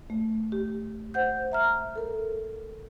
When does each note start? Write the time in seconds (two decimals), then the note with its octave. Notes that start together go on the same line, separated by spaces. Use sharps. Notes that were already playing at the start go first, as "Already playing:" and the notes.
0.10 A3
0.52 G4
1.14 C5 F#5 G6
1.52 E5 A#5 F6
1.96 A4 A#4